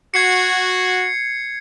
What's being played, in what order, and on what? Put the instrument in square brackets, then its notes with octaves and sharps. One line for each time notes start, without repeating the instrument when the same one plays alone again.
[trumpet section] F#4 [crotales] G#6 C7 C#7